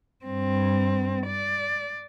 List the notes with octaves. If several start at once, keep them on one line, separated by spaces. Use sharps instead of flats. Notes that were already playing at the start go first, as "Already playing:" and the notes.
G2 C4
D5